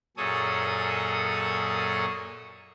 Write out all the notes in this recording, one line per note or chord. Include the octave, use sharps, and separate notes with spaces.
F#2 A#2 G#4 A4 C#5 D#6